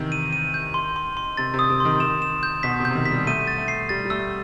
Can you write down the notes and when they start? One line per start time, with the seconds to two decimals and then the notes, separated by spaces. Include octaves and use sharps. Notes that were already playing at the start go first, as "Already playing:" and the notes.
Already playing: C3 D#3 E3
0.12 D#7
0.33 D#7
0.54 G6
0.74 C6
0.96 C6
1.17 C6
1.37 C3 A6
1.54 C3
1.59 D#6
1.70 C3
1.80 D#3 C6
2.00 D#3 E7
2.22 E7
2.43 G6
2.63 B2 B6
2.80 C3
2.85 G6
2.91 C3
2.95 D#3
3.05 B6
3.11 G3
3.27 A3 D#7
3.48 A6
3.58 A3
3.68 C7
3.89 G3 A6
4.05 G3
4.10 A3 E6